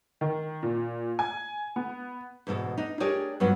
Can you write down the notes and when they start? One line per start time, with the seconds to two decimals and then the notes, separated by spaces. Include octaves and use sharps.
0.21 D#3
0.63 A#2
1.19 G#5
1.76 B3
2.47 E2 G#2 B2 A4
2.77 D4 D#4
3.00 D4 G4 G#4 A#4 C#5 D5
3.40 G2 F3 F#3 B3 D5